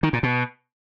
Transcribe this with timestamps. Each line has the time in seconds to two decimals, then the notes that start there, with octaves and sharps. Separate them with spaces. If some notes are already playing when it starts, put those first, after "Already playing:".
0.03 D#3
0.13 A#2
0.23 B2